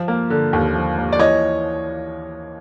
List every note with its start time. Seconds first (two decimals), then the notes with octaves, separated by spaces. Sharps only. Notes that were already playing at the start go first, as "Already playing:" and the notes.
Already playing: F3
0.08 A#3
0.30 D3
0.53 D#2
0.75 F3
0.98 A#3
1.13 D5
1.19 E3 C#5 D#5